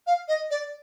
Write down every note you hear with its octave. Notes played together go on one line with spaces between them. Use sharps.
F5
D#5
D5